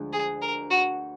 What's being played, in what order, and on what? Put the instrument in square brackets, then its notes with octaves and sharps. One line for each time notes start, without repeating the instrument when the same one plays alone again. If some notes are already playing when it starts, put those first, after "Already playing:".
Already playing: [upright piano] D2 D3 F3 G#3
[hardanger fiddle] G#4
A#4
F#4